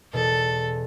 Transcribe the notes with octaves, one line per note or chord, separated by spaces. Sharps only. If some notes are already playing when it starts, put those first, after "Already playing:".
E2 B2 A4